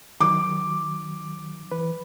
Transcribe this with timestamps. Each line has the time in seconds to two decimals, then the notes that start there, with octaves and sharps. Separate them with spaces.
0.21 D#3 F#3 D6
1.71 E3 B4